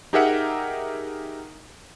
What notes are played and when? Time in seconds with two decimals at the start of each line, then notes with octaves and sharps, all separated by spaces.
0.13 D#4 G4 G#4 A#4 E5 F#5